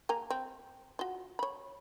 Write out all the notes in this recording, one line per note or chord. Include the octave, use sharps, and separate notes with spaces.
A#3 G#5 A#5
C4
F4 F#4
C#5 B5